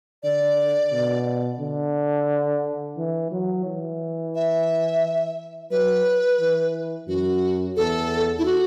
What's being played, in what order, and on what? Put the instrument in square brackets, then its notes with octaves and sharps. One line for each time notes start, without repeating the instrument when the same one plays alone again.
[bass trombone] D3 [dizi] D5
[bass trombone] B2
D3
E3
F#3
E3
[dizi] E5
[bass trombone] F#3 [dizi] B4
[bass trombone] E3
[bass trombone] F#2 [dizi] F#4
[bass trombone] E2 [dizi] A4
[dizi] E4
F#4